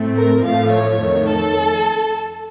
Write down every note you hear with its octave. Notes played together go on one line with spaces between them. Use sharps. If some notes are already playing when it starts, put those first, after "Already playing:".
Already playing: A2 A3 C4
A#4
A2 F3 A3 F5
C#5
F2 D#3 A3
A4